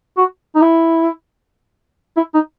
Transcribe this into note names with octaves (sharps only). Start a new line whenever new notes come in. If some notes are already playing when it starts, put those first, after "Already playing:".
F#4
D#4
E4
E4
D#4